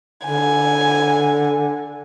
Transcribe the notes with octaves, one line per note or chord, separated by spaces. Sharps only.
D3 G#5